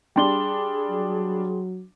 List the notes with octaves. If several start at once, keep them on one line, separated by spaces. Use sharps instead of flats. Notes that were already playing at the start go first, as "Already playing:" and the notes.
G3 D4 G#4 G5 C6 G7
F#3